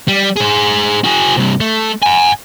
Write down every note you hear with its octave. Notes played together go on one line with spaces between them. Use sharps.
G3
G#4 C5
F#4 G#4
G2 C3
A3
F#5 G#5